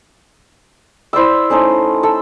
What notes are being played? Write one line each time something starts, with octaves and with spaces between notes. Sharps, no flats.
E4 C5 D5 E6
A3 C#4 D#4 C5
A4 E6